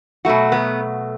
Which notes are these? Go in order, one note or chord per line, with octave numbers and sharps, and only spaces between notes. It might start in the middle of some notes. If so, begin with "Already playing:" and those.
B2 F#3 A3 F#4
B3